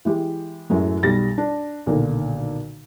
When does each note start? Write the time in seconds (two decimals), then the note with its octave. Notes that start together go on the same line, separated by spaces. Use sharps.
0.05 E3 G#3 G4
0.70 F#2 A2 F#3 G#3
1.03 B1 G3 A6 A#6
1.38 D4
1.86 B1 A#2 D3 D#3 A#4